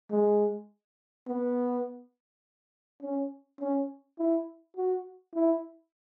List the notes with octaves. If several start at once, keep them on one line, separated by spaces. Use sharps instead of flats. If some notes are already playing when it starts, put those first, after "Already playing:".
G#3
B3
C#4
C#4
E4
F#4
E4